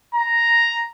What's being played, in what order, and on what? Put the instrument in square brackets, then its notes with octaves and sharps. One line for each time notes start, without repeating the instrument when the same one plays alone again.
[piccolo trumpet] A#5